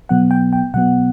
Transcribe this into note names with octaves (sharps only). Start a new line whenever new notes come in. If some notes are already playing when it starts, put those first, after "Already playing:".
B2 F#3 B3 F#5
G5
G5
B2 F#3 B3 F#5